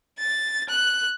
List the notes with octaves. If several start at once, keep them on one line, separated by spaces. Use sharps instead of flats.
A6
F#6